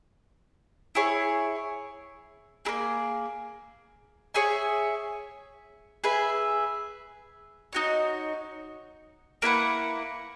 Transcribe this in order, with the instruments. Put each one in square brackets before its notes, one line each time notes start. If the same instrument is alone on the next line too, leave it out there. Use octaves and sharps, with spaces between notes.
[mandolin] E4 G#4 C#5
A#3 E4 G#4
G#4 C#5 E5 G#5
G#4 B4 E5
D#4 F#4 C#5
A#3 E4 B4 F#5